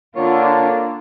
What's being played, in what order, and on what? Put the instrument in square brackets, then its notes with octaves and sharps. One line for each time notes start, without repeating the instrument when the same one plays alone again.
[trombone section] D3 [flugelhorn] A#3 [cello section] D4 F4 [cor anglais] C#5